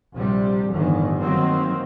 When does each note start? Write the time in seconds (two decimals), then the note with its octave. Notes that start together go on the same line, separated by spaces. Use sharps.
0.14 A#1 C3 G3
0.71 G1 A2 D#3 E3
1.19 D#3 F#3 A#3 C4